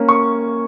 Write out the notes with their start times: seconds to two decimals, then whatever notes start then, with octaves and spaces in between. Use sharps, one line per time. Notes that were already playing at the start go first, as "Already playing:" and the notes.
Already playing: A#3 C#4
0.09 C#6